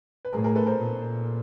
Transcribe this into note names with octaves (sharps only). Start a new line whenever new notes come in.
B4
A2 G#4 A#4
G#4 A#4
A4 B4
A#4 C5
A#2